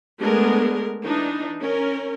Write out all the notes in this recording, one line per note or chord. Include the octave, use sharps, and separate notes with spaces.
G#3 A3 B3 D4 G#4 A#4
E3 D4 D#4
C#4 A#4